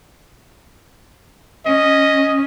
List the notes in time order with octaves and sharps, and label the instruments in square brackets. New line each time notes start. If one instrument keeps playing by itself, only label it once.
[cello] C#4 [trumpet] D#5